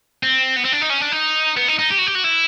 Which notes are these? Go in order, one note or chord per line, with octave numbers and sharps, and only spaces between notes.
C4
B3
C4
D4
D#4
C#4
D4
D#4
B3
D#4
D#4
G4
F#4
G4
F#4
E4